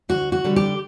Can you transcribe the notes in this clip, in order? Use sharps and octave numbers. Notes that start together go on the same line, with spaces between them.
D2 F#4
F#4
D3 G3
G4